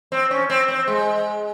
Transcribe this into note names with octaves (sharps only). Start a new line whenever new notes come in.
C4
C#4
C4
C4
G#3